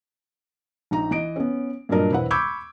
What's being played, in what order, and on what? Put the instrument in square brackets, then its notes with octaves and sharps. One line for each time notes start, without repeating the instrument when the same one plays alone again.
[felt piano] A#1 D#4 A#5
E3 D#5 D7
B3 C#4
G2 A#2 F#3 D4 A#4 D#5
E1 C4 E4 B4 F#5
B5 C#6 D6 E6 G6 G#6